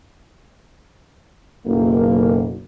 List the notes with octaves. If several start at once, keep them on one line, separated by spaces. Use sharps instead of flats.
F#1 B1 A#3